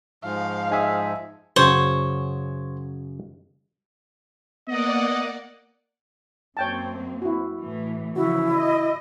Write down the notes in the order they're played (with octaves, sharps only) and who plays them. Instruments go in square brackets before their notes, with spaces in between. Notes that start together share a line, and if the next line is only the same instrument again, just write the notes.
[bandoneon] G#2 F3 [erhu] F5
[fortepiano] D#4 G#4 E5
[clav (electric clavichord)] F#2 C#3 F#3 [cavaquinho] C5 C#5
[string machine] A#3 D5 F#5 [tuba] B3 [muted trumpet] D#5
[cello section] F#2 A#3 C4 [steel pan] C#5 G5 A5
[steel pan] E4 F#4
[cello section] A2 E3
[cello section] C#3 E3 F3 [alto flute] E4 [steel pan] F#4
[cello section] D#5